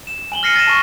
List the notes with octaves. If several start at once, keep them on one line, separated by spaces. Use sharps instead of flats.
E7
G#5 F#7 G7
F6 A#6 C7 C#7 D#7
A6 A#6 D#7 E7
A5 C#6